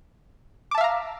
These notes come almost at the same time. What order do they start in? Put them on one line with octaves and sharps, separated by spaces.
D6 A5 E5 F5 A#5